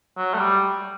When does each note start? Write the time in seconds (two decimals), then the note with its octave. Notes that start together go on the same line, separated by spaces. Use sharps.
0.17 F#3
0.34 A3
0.39 G3